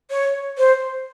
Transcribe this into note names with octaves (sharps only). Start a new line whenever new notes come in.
C#5
C5